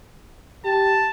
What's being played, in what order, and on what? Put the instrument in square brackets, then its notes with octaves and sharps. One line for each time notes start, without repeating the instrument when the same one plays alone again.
[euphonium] G4 [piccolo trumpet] A5